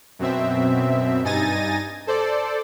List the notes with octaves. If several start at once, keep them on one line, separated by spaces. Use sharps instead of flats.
F#2 B2 C4 E5
G2 D#4 G#5 A6 A#6 D#7
A4 C5 D5